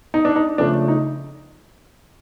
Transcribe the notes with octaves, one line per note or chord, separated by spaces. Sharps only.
D#4
D4
D#4
C#3 F3 A3 D4
D#4